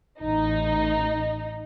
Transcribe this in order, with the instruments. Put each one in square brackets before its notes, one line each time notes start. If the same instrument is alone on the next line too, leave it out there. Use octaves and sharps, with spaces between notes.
[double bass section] A1 [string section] D#4